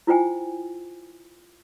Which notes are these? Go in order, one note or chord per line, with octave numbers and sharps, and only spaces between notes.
E4 F4 C5 G5 G#5